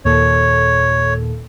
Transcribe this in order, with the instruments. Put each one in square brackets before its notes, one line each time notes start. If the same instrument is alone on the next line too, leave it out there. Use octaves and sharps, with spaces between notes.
[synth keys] D#2 A#2 A4 [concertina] C#5